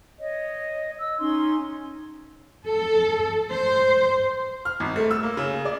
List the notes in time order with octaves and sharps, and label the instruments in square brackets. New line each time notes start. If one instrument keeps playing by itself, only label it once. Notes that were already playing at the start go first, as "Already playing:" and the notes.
[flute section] C#5 D#5
E6
C#4 D#4 C6
[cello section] A4
C5
[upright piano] F6
G#1
A3
E6
A#3
C#3
D5